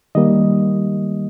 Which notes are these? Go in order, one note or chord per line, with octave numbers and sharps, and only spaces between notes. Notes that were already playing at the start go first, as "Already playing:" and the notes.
D#3 G3 A#3 D#5